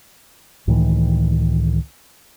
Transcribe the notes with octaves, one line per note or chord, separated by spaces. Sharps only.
C#2 A2 D#3 E3